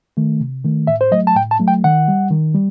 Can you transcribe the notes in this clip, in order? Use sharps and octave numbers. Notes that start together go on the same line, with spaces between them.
D#3 A3
C3
D#3 A3
A2 E5
C5
F#3 A3 D#5
A5
A2 G5
A5
F#3 A3
G5
D#3 F#5
G3
D#3
G3